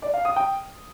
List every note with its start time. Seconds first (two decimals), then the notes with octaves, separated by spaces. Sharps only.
0.02 D5
0.14 F5
0.25 D#6
0.36 G5